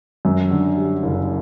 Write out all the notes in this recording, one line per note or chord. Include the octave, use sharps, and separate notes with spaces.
F#2
D3
G3
F#1